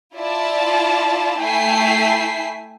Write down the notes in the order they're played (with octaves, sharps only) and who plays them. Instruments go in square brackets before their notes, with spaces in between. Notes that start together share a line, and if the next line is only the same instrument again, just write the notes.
[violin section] E4 F4 D5 A5
A3 E4 G5 G#5 B6 C7